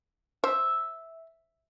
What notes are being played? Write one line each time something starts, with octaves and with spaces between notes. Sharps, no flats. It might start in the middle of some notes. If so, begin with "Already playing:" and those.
C5 E5